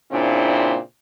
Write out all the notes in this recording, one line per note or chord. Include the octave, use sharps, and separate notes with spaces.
A#2 C#3 C4 D4 E4